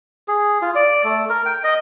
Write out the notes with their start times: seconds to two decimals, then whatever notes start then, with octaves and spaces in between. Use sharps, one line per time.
0.28 G#4
0.62 F4
0.75 D5
1.04 A3
1.30 A#4
1.46 G5
1.64 D#5